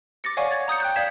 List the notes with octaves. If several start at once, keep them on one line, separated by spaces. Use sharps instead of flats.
D6 A6 A#6 C#7
C#5 D5 F5 F#5 G#5 C#6
G#6 A6
A#5 D#6 G6 C#7
G5 F#6 G6
D5 F5 G6 G#6 B6 E7